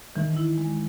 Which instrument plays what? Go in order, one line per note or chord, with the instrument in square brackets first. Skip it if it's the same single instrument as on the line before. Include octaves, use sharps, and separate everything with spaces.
[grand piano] D#3 [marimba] E3
[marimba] E4
G#3